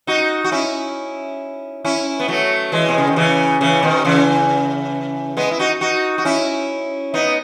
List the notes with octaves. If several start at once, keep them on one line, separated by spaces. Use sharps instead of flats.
D#4 F#4
F#4
C#4 E4
C#4 E4
B3
F#3 A3
E3 G#3
B2
C#3
D#3
C#3 E3
C#3 E3
B2 D#3
C#3 E3
G#3 B3
E4
D#4 F#4
D#4 F#4
F#4
C#4 E4
B3 D#4